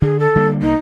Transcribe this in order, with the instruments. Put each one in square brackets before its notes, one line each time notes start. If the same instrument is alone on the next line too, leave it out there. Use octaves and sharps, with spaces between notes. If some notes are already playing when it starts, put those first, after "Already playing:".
[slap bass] D3 [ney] G#4
[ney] A4
[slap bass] D3 G3 A#3
[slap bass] C2 A#3 [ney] D#4